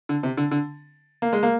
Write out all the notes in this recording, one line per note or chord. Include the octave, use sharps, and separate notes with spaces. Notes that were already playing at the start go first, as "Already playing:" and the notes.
D3
C3
D3
D3
A#3
G#3
A#3